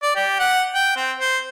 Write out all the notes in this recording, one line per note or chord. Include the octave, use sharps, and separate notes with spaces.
D5
G4
F#5
G5
C4
C5